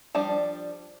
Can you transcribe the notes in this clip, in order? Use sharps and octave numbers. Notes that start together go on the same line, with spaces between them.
F3 G3 D4 A5